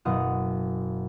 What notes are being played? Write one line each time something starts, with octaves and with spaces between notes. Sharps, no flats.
F#1 B2 F5 F#5 D#6